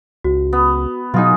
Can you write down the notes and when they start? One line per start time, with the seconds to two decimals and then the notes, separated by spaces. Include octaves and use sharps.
0.24 C#2 F#4
0.53 B3
1.14 B2 F#3 D#4 F4 G#4